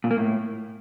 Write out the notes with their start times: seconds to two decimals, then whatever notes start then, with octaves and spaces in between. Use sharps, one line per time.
0.04 A#2
0.11 A#3
0.17 A2